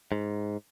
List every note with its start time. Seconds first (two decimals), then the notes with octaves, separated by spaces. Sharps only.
0.12 G#2